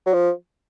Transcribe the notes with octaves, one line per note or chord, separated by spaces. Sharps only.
F#3
F3